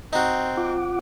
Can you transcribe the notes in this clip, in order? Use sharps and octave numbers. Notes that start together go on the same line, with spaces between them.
C4 D#4 F#4
F4 F#5 D6